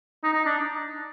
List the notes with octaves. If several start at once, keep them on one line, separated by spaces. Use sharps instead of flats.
D#4
D#4
D4